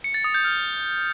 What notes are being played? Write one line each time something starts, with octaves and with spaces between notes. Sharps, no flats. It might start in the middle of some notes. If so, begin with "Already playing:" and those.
C#7
A6
D#6
G6
F6